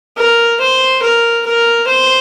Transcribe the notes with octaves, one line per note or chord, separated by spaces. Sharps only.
A#4
C5
A#4
A#4
C5